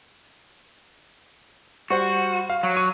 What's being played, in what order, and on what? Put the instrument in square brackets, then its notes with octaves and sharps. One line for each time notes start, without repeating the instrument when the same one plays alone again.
[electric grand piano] G3 C5 F#5 [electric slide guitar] F#4
[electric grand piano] F5
[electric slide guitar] F#3
[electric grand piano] C#6 D#7